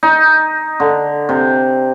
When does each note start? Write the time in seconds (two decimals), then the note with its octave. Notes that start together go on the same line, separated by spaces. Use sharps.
0.03 D#4
0.80 D3
1.29 C3